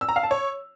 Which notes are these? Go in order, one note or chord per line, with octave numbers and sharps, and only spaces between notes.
E6
A#5
F5
A5
C#5